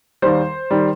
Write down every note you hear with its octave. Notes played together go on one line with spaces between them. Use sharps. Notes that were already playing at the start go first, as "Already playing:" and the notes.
D#2 D#3 G3 C5
D#3 G3